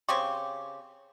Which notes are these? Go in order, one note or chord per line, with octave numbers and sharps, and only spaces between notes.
C#3 C4 G4 C#6